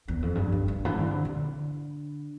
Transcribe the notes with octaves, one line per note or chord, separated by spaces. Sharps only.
E2
F2
G2
G2
G2
E3
D3
C3
D3